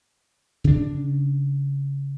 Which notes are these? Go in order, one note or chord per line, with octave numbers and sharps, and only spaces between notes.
C#3 D4